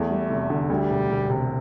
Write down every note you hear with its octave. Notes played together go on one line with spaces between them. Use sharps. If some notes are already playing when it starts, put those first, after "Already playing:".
Already playing: E2 A3
G3
F1
D3
D2 G3
E1
E1
C3